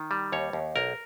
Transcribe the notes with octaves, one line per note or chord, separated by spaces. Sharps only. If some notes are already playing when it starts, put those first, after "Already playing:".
Already playing: D#3
G3
D#2 C#5
D#2
B1 A#4